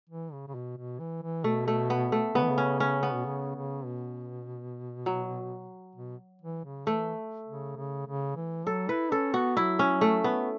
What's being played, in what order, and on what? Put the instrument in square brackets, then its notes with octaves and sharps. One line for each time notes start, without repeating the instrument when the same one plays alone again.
[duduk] E3
C#3
C#3
B2
B2
E3
E3
[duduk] B2 [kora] A3
[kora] A3
B3
A3
[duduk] C#3 [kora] B3
[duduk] E3
C#3
[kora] C#4
C#4
B3
[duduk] B2
C#3
C#3
B2
[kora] F#3
[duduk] B2
E3
C#3
[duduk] E3 [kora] A3
[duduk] C#3
C#3
C#3
E3
[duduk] F#3 [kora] A4
[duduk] E4 [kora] B4
[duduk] C#4 [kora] A4
[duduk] B3 [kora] F#4
[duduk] F#3 [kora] E4
[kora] C#4
A3
B3